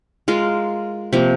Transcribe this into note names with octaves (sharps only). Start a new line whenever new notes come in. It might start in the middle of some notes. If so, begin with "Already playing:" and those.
G#3 F4 A#4
C3 F3 A#3